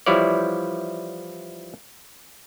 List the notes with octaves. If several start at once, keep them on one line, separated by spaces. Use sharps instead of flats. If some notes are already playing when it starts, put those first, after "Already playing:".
E3 F3 G3 E4 C#5 D5